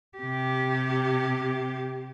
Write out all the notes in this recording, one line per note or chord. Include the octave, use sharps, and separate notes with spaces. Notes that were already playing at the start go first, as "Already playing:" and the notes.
C3 G4